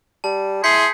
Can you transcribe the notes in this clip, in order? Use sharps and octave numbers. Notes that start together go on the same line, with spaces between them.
G3 A5
E4 G#4 C6 G6 B6 C#7